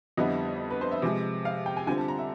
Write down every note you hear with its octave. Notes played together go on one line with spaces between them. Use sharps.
F2 D3 G3 B3 E4 D#5
B4
C5
E5
C3 F3 G#3
F5
G5
G#5
D3 G3 C4 F4 G#5
A5
A#5
E5